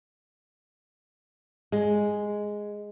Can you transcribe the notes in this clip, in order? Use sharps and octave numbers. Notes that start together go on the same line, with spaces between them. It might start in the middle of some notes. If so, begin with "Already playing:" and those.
G#3